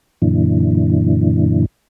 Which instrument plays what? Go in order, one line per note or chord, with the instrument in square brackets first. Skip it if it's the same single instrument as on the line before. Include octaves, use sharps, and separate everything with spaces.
[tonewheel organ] F#2 A#2 D3 E3